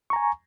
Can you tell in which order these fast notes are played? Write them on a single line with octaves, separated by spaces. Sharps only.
C#6 A#5 G#5